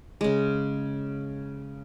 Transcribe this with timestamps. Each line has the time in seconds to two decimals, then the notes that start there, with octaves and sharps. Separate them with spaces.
0.21 C#3 G#3